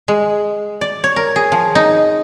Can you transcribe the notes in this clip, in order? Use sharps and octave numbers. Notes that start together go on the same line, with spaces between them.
G#3
D5
C#5
A#4
G#4
F3
D#4